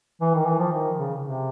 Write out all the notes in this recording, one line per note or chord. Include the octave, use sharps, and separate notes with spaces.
E3
D#3
E3
F3
D#3
C#3
C3